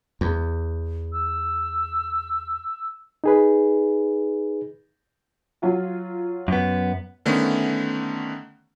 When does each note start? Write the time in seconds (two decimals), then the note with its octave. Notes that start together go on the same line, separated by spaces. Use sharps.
0.21 E2
1.13 E6
3.24 D#4 G#4 B4
5.62 F#3 F4 F#4
6.48 F#2 B3
7.26 D3 D#3 A3 B3 C#4